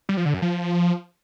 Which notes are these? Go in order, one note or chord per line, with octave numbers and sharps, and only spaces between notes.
G3
F3
D3
F#2
F3